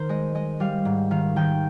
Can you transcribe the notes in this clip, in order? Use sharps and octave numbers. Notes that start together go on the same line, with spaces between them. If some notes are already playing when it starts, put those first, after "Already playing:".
Already playing: D#3 A#4 C5
G#3 D#5
G#3 D#5
G3 F5
G#2
D#3 F5
D#3 G5